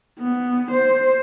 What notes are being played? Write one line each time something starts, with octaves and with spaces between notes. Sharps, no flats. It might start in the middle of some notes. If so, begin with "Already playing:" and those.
B3
C5